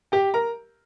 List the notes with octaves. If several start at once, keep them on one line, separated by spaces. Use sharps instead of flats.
G4 G5
A#4 A#5